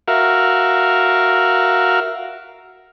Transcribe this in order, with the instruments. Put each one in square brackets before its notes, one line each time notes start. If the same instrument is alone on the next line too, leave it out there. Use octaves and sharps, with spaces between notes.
[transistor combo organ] F#4 A#4 E5 F5